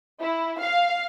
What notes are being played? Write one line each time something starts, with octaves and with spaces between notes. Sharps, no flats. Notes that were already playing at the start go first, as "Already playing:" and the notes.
E4
F5